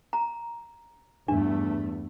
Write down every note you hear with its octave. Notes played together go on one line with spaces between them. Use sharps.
A#5
E2 G2 A3 D4